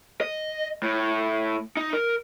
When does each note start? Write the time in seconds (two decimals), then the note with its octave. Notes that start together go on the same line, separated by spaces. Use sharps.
0.21 D#5
0.83 A2
1.77 D#4
1.93 A#4